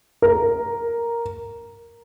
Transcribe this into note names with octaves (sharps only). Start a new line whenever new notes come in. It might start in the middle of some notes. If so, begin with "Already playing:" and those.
A#4